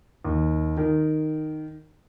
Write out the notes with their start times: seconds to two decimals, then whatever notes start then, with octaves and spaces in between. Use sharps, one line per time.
0.25 D#2
0.77 D#3